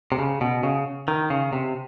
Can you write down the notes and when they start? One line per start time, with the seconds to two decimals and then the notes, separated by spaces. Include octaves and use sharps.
0.12 C3
0.19 C#3
0.41 B2
0.63 C#3
1.08 D#3
1.30 C#3
1.53 C3